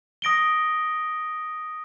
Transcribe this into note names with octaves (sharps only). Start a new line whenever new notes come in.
D#6 A#6 D7 G7